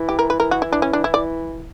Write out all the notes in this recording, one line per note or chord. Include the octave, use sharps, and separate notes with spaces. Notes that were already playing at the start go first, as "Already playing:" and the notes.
Already playing: E3
G4
A#4
B4
E3 A#4
F#4
E4
D4
C#4
D4
E4
D5